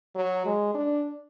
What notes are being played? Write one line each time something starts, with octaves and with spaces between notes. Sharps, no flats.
F#3
G#3
D4